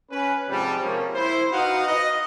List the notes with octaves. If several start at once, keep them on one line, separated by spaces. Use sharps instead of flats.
C#4 B4
G#2 C3 F3 G3
C3 F3 A#3 C#4
E4 C5
D#4 F#4 B4 D#5 F5 F#5
D#5